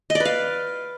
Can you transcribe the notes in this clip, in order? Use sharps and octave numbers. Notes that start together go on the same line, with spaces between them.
D#5
D5
B4
F5